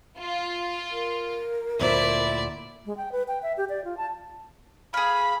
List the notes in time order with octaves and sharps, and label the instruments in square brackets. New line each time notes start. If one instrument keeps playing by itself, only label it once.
[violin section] F4
[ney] A#4
[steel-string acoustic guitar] D2 A#2 C5 [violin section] E4 [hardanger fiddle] D5
[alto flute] G#3
G5
B4
G5
E5
G4
D5
F4
A5
[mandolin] G#4 F5 [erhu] B5